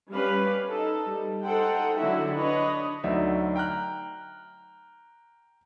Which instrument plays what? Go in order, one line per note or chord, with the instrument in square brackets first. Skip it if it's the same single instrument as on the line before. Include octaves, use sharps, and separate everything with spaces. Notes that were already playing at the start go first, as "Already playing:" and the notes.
[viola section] G3 C#4 G4 B4 F5
D#4 A4
G3
D#4 A4 C5 F#5 G5
D3 F#3 E4 F#4 A4 E5
D4 B4 C#5 D#5
[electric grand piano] D2 F#3 D#4 D5 E5
G5 A#5 F6 F#6